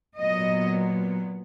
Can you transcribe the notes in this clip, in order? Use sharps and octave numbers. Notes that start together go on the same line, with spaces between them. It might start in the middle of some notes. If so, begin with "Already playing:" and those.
A#2 F#3 B3 D#5